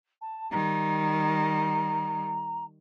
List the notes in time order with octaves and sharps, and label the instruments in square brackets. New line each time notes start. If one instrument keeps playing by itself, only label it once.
[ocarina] A5
[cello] D#3 G3 [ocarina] A#5